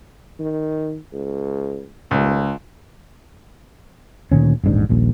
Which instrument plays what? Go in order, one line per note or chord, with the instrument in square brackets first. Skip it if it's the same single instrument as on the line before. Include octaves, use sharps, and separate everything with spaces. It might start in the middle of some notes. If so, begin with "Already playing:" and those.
[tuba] D#3
C#2
[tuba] D#1 [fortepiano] C#2
[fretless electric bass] D2 A#2 D#3 C#4
D#1 A1 G#2 D4
D#1 A#1 D#2